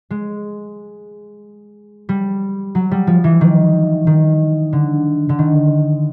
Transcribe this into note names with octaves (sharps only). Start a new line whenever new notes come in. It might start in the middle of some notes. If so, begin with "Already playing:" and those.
G#3
G3
F#3
G3
F3
E3
D#3
D#3
D3
D3
D#3